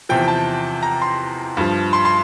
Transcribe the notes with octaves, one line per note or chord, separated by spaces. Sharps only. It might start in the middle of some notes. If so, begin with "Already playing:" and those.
E2 C3 F3 G5
A5
A#5
C6
G2 F3
C6
C6